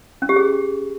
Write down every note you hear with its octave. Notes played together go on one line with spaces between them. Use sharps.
C#4
G4
G#4